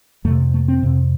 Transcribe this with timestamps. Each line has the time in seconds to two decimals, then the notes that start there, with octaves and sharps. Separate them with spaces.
0.25 F2 C3 A3
0.54 A3
0.68 C4
0.83 F2 C3